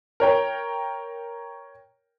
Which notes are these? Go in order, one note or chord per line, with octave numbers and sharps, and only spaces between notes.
A#4 C#5 G5